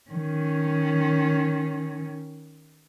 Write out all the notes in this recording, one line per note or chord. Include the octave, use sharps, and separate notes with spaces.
D#3 C#4